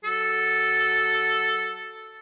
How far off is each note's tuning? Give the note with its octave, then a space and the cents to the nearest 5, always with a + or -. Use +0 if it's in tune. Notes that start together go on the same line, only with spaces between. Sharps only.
F#3 +0 A4 +0